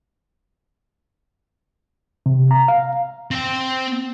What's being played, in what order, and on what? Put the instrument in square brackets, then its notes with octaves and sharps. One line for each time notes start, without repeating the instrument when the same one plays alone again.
[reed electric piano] C3
A#5
F5
[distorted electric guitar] C4 G5